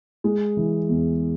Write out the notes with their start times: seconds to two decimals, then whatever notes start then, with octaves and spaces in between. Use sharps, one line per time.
0.24 G#3
0.57 E3
0.89 E2